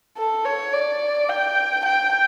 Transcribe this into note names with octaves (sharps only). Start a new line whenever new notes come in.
A4
C#5
D5
G5
G5